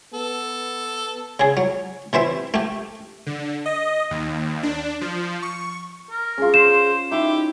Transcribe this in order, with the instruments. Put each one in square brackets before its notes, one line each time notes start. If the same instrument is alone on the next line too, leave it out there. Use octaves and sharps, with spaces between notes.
[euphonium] B3 [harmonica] A4
[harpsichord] C#3 G#4
F#3
C3 E3 C5 E5
A3 G4
[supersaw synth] D3
D#5
D#2
D4
F3
C#6
[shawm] A#4
[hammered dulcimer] C#4 F4 [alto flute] G#4
[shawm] C5 [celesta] E7
[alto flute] D#4 [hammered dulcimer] E4 [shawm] G4